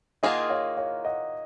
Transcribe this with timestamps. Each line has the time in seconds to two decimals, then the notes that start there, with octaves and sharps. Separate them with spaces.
0.23 D#3 A#3 F4 G#4 D#5 F#5
0.50 C#5 F5
0.77 C#5 F5
1.05 D#5 F#5